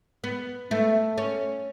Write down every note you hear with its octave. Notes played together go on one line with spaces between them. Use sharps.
B3
A3
C#4